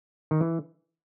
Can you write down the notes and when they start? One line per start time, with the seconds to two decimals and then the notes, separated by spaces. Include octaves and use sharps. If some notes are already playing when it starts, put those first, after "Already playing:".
0.31 D#3
0.41 E3